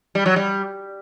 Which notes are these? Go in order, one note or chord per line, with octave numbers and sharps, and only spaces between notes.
G3
F#3
G3